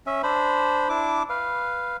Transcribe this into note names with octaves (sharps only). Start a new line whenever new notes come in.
C#4 E5
D4 C5 B5
D4 E4 D6
B4 F5